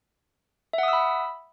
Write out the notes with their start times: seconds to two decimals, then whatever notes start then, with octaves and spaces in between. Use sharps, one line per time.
0.73 E5
0.78 F#5
0.83 D#6
0.88 E6
0.93 B5